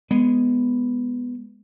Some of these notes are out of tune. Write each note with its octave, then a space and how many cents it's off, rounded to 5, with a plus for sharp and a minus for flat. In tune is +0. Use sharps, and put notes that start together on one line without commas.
G#3 +0 B3 +0